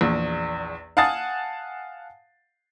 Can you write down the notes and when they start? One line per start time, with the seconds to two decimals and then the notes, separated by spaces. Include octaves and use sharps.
0.01 A#1 E2
0.97 F5 F#5 G#5 A5 D#6 A6